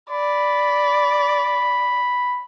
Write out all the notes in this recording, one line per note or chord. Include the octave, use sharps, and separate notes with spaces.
D5 B5